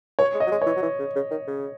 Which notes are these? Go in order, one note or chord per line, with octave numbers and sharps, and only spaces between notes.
F#3 C#5
G#3
D#5
F#3
G#3
E3 C#5
F#3
E3
C#3
C#3
D#3
C#3